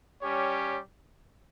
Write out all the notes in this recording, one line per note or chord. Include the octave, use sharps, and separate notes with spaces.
G3 C#4 G4 C#5